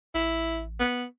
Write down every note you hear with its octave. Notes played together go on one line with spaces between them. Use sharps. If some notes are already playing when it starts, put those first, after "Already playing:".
A1 E4
B3